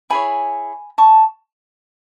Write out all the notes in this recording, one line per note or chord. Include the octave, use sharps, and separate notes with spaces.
E4 G#4 C#5 G#5 B5
A5 C#6